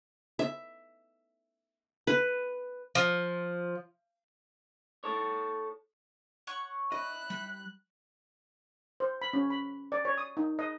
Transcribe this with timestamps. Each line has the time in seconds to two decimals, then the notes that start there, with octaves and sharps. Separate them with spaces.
0.39 E5
2.07 B4
2.95 F3
5.04 A4 C#5
6.47 C#5 F#5 C#6
6.92 E4 D#5 F#6
7.30 G3 B5
9.00 C5
9.22 B5
9.33 C#4
9.50 B5
9.92 D5
10.05 C#5
10.18 D#6
10.37 D#4
10.59 D#5